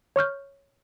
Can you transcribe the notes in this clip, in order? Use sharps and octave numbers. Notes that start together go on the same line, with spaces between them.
C#5 C#6 F6 G6